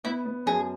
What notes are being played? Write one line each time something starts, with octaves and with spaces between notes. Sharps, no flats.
B3 E4
B3
F#2 G#4